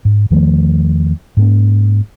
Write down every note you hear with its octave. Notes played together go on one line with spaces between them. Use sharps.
G#2
E2 D#3 F3 A3
G#2 A#3 C#4